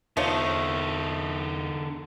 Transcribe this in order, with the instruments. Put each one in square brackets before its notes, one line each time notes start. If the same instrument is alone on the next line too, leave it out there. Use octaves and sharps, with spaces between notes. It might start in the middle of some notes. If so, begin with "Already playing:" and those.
[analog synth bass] E2 [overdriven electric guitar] D3 D#4 [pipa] F3 A3 C#5